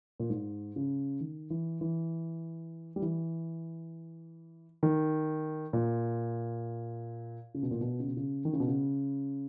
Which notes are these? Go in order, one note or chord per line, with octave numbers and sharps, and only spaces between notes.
A#2
G#2
C#3
D#3
E3
E3
G3
E3
D#3
A#2
C#3
B2
A#2
B2
C#3
B2
C#3
D#3
C#3
B2
C#3